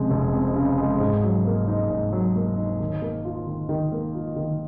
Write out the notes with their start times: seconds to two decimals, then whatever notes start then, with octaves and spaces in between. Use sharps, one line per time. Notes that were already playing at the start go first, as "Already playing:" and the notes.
Already playing: F1 F2 C#3 G#3
0.11 F1
0.34 F2
0.56 C#3
0.78 G#3
1.00 G#2
1.23 F#3
1.46 A#3
1.68 D#4
1.90 G#2
2.12 F#3
2.36 A#3
2.58 D#4
2.80 D#3
3.02 A#3
3.25 F4
3.47 D#3
3.69 D#3
3.92 A#3
4.15 F4
4.36 D#3